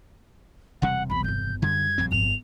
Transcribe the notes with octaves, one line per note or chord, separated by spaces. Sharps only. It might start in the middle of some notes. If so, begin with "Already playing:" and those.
E1 C3 G3 F#5
B1 E2 B5
G1 F2 G6
F#2 D3 G3 G#6
A#1 F2 C4
G1 E2 F7